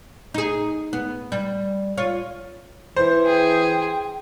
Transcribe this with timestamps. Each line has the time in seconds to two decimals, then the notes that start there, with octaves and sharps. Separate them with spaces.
0.34 D#4 G#4
0.93 B3
1.32 G3
1.98 F4 C#5
2.96 E3 C5
3.26 G#4 G5